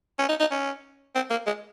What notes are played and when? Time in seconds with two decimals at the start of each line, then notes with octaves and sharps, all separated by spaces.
0.19 C#4
0.29 D#4
0.40 D#4
0.51 C#4
1.15 C4
1.30 A#3
1.46 G#3